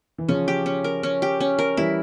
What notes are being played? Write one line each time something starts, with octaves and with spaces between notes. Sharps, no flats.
E3
C#3 F3 C#4
G4
C#4
A#4
C#4
G4
C#4
A#4
E3 G3 E4